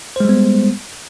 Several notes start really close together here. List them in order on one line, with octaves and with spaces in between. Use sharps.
C5 G#3 G3 B3